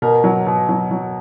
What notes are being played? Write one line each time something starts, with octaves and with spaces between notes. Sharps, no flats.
B2 A#4
F#3
B2
F#3
F#3